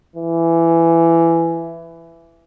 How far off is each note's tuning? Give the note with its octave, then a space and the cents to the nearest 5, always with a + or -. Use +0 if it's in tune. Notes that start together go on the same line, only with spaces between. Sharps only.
E3 +15